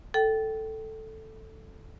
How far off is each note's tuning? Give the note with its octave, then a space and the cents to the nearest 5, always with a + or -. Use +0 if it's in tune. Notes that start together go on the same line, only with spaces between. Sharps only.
A4 +0 G5 -20